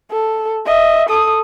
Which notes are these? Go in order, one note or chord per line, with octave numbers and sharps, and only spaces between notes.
A4
D#5 E5
A4 D#6